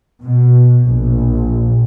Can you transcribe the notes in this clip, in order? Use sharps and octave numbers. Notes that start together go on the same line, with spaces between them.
B2
A#1